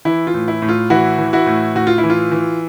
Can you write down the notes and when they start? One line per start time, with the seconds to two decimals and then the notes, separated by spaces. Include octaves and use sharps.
0.05 E3 E4
0.27 F4
0.34 A2
0.48 E4
0.62 A2
0.69 F4
0.90 E3 E4 F#4
1.18 E3
1.33 E4 F#4
1.46 A2
1.75 A2 F#4
1.87 F4
1.98 E4
2.03 E3
2.10 F4
2.32 E3